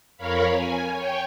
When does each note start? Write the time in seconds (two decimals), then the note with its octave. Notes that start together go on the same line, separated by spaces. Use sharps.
0.17 F2 A#4 C#5 F5 B5
0.52 G#5
0.92 C#5 G5